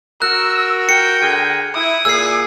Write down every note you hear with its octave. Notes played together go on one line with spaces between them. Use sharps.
F#4 A#4 E6 F#6
G5 C#7
D3 G#4 A#4
E4 D#6
A#2 G#4 E6 C7